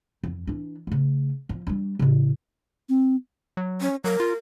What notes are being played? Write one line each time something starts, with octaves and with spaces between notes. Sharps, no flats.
F2
E3 D4
C#3 A3
F3
G3 D4
A2 C#3
C4
F#3
C#4
F#3 A#4
F4